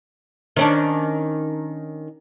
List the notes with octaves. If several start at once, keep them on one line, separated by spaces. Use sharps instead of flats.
D#3 C#4 D4